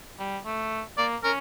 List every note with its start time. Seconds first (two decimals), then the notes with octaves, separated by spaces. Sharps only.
0.19 G3
0.45 A3
0.98 A#3 D5
1.24 C#4 A#4